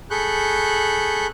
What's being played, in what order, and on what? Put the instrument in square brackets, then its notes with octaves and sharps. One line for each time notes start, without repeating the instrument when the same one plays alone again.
[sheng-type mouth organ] G#4 A4 B5 C#6 F#6 G6